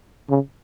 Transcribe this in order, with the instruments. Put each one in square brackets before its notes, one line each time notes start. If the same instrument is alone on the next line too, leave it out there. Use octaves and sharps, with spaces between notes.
[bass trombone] C#3